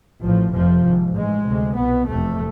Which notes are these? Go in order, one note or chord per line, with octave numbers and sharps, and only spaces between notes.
A1 A2 F3
F1 F2 C3 F3
G#1 G#2
A1 G#2 G#3
D2 C3
C2 B2 B3
F1 E2 C3 A3